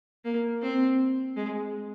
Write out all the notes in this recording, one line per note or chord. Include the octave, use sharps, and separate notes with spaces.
A#3
C4
G#3